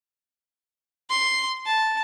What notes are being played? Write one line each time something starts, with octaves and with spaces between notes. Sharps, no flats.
C6
A5